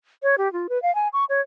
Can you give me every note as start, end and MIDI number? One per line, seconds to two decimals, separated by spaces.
0.23 0.36 73
0.38 0.51 67
0.53 0.67 65
0.69 0.81 71
0.83 0.94 77
0.95 1.08 80
1.13 1.25 85
1.29 1.41 73